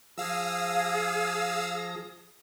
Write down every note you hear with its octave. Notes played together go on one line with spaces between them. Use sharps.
F3 G#4 F5 E6 A#6